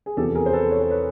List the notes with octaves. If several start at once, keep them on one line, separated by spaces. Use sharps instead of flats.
G#4
E2 C3 F3 G4 A4
G#4 A#4
C5
A4 B4
C#5
C5
B4 C#5